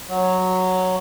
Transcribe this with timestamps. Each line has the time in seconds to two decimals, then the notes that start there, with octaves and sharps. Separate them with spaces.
0.09 F#3